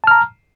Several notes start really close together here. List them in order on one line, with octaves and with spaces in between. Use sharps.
A5 F6 A#5